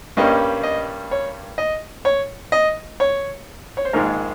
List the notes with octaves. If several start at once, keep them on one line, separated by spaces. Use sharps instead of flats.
G2 G3 A#3 C#4 D#5
D#5
C#5
D#5
C#5
D#5
C#5
C#5
C5
A#1 G#2 D#3 G#3 A#4